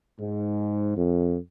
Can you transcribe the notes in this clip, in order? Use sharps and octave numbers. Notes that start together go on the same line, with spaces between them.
G#2
F2